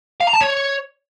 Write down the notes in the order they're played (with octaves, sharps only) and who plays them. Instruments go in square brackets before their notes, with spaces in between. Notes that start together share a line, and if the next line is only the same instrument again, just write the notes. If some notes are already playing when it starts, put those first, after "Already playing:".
[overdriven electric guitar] F5
A#5
A5
C#5